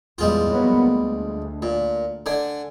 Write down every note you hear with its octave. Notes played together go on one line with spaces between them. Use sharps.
E2 A2 G3 G#3 F4
F#3 A#3 B3
D2
A#2
D3 D4 G#5